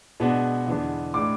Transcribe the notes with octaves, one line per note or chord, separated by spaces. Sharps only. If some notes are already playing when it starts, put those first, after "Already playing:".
B2 G#3 B3 D4
E2 D3 G#3 B3 D4
A2 G#3 D4 D6